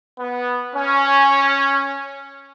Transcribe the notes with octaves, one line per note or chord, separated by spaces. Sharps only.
B3
C#4